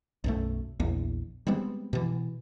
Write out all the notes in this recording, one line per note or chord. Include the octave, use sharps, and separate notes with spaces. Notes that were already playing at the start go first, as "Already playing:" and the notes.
B1 F#2 A3
A#1 E2
G3 G#3 B3 C4
B2 E3